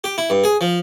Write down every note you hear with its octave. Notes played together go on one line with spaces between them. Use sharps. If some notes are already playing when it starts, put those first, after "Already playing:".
G4
E4
G2
G#4
F3